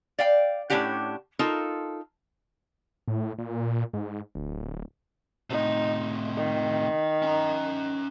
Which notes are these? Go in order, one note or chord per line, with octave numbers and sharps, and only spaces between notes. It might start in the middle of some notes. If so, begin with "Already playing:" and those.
D5 F5 G5
A2 A#3 C#4 D4 G4 F#5
D#4 F4 A4 A#4
A2
A#2
G#2
D1
A2 C3 D#4
D#3
C#4 A#5